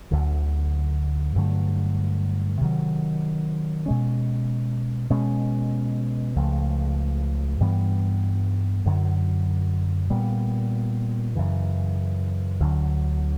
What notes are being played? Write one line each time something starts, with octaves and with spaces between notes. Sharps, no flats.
D2 D3 F#3
G2 D3 F#3 A3
C3 D#3 F#3
B2 G#3 C#4
B2 G#3 C#4
C#2 C#3 F3 A3
G2 E3 G3 B3
F#2 D3 F#3
A#2 G3 B3
F#2 C#3 E3
D2 D3 F#3